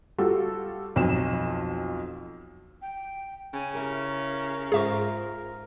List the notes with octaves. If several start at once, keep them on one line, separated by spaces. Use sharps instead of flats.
G3 F4 F#4 A4
B1 F2 F3 E7
G5
C#3 G#5
E4 G4 A#4
G#2 F4 G#4 C5 E5 C#6